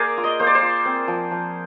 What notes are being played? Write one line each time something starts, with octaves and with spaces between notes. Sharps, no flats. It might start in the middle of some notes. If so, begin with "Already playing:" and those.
Already playing: A#3 G#4 A#4 C5 D5
F4
D#5
A#3 C5
D5
C5
F4
C4
F3
F3